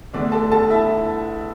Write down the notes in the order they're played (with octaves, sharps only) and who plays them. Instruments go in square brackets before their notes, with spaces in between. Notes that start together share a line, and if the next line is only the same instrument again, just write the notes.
[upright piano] E2 D3 A3 D4 D5
A4 A5
A4 A5
E4 E5